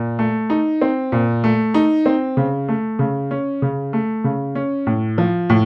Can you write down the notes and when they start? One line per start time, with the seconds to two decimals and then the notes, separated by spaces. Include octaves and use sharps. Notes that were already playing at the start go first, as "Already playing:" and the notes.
Already playing: A#2
0.19 A3
0.50 D#4
0.81 C4
1.12 A#2
1.44 A3
1.74 D#4
2.06 C4
2.37 C#3
2.69 A3
2.99 C#3
3.31 C#4
3.62 C#3
3.93 A3
4.24 C#3
4.55 C#4
4.87 A2
5.18 F3
5.50 A2